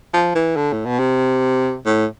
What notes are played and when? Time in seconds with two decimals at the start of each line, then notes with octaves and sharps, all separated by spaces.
0.14 F3
0.35 E3
0.57 D3
0.72 A2
0.85 B2
0.99 C3
1.86 A2